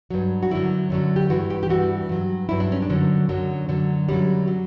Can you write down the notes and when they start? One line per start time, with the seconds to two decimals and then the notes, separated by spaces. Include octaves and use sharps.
0.10 G2 F#3
0.43 F#4
0.51 F#2 D3 F#3 E4
0.90 F#2 D3 F#3
1.16 G4
1.30 G2 E3 F#4
1.50 G4
1.63 G4
1.69 G2 E3 F#4
2.09 G2 F#3
2.49 G2 F#3 E4
2.60 D4
2.72 C#4
2.82 D4
2.90 F#2 D3 F#3
3.29 F#2 D3 F#3
3.68 F#2 D3 F#3
4.09 F#2 D3 F#3 G3
4.48 F#3